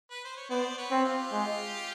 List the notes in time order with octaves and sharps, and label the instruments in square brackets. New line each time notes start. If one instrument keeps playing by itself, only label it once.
[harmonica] B4
C5
C#5
[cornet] B3 [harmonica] C5 D5
[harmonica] B4 C#5
[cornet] C4
[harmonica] F4 G4
[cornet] G#3